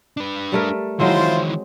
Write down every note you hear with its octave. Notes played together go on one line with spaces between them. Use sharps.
D4 B4
G3 A3 A#4
D#3 E3 F#3 G#3 C4 E4 F4 C5